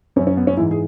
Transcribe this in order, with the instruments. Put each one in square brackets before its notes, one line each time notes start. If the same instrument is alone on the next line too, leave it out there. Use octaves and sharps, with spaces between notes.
[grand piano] F#2 F#3 C#4
C#4
B3
C#4
G#2 E3 E4
G#4